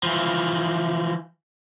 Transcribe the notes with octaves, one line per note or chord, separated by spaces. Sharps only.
E3 F3